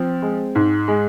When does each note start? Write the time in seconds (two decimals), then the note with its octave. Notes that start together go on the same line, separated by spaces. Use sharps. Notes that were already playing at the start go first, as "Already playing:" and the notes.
Already playing: F3 C4
0.22 G#3
0.55 G#2
0.88 G#3